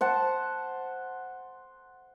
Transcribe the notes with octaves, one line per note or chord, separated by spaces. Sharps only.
C5 F#5 A5